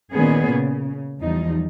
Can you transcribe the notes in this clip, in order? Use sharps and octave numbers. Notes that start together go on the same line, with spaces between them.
A#2 D#3 B3 C#4 G#4
C#3
E2 F3 G3 D#4